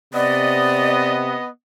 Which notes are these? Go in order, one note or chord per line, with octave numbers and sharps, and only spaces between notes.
C3 B3 D5 D#5